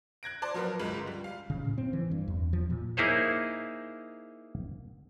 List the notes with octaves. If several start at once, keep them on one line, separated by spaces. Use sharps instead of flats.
F#6 G#6 A#6 D7
C5 D5 A5 C6 D6
F3 F#3 F4 A#4 B4
G1 C#2 G#3 F4 B5
G3
F5
C#3
A2
C4
E3
G2
E2
F3
A#2
A#3 D#4 E4 G#4 C5 C#5